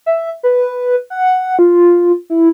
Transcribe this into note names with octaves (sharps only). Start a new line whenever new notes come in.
E5
B4
F#5
F4
E4